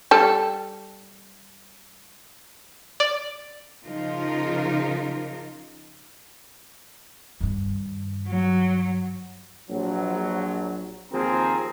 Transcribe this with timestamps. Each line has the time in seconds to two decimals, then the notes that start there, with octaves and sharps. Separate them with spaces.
0.11 G3 A4
3.00 D5
3.84 C#3 F3 D#4 F4 A#4
7.41 G2 D#3
8.28 F#3
9.70 A#1 F#3
11.12 D#2 F3 C4 G#4 A#4 A#5